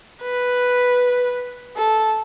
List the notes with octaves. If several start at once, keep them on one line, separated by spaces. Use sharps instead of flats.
B4
A4